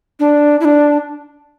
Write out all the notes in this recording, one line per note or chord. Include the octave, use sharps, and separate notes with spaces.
D4
E4
D4